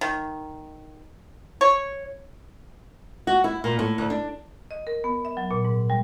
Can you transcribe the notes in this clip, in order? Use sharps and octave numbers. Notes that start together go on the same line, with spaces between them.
D#3
C#5
F#4
E4
A#2
A2
D2
D4
D#5
A#4
B3
E5
F#3
A#2
G#2
G3